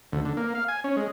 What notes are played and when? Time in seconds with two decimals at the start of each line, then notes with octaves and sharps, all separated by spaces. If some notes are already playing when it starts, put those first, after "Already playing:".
0.13 D2
0.25 D3
0.37 A#3
0.55 F5
0.68 G#5
0.84 C#4
0.97 G#3